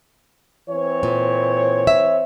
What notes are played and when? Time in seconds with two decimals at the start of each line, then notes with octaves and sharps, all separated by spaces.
0.70 E3 C4 C#5
1.03 A#2
1.87 E5